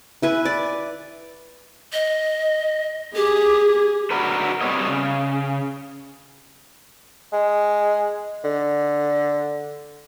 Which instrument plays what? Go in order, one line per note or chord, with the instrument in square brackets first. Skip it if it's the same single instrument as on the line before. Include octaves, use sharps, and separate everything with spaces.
[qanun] E4 B4 G#5
D5
[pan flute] D#5
[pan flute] G4 [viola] G#4
[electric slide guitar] D3 F#4 A#4 B4
C3 G3 A#3 B3 C#5 D#5
C#3
[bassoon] G#3
D3